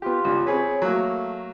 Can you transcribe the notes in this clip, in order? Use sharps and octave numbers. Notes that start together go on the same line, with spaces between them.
B3 F4 G4
C#2 G3
C4 G#4 B4 C#5
F#3 A3 A#3